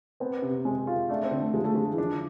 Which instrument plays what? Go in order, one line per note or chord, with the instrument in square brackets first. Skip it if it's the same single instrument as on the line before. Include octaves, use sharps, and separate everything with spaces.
[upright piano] B3 [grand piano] C4
[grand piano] C3
[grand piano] G#3 [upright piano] C4
[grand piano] F4
[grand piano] A3 [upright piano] D4
[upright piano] C4
[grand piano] D3
[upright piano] A3
[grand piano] F3 [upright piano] G#3
[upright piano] A3
[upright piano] G#3 [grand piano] D4
[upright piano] E3
[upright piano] F3 [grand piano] D4